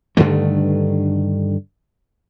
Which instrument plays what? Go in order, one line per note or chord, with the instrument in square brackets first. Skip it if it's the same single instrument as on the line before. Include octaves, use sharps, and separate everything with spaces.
[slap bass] G2 D3 D#3 A3